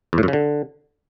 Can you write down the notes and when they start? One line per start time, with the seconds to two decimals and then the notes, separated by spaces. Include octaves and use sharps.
0.13 E2
0.18 A2
0.23 F#2
0.28 C#3
0.33 D3